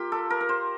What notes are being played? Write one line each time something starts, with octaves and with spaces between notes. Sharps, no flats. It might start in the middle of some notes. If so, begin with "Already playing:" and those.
Already playing: A#3 F4 G4
A4
A#4
A#4
C5